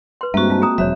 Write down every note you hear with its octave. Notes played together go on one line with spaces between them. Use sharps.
B4 C6
G2 G#3 A#3 C4 F#4 E5 C#6
C4 F4 A5
G#4 A#5 D#6
E1 C#2 F#3 F#4 C5 C#5 E5